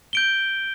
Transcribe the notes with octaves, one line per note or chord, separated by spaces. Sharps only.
G6 D7 G7